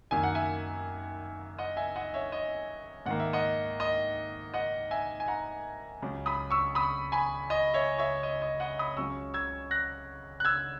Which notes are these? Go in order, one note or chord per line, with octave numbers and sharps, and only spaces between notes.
F#2 D#3 A#3 D#4 G#5
F#5
E5 G#5
D#5 F#5
E5 G#5
D#5 F#5
C#5 E5
D#5
G#2 D#3 A#3 F#5
E5
D#5 F#5
D#5
D#5 F#5
E5 G#5
G#5
F#5 A#5
C#2 C#3 F#3 C#4
B5 D#6
C#6 E6
B5 D#6
G#5 B5
D#5
C#5 E5
C#5 E5
D#5
D#5
D#5 F#5
B5 D#6
C#2 C#3 F#3 C#4 C#6 E6
E6 G#6
F#6 A#6
F#6
E6 G#6